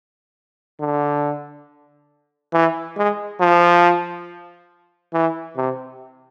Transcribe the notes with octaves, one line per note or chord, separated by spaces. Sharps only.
D3
E3
G#3
F3
E3
C3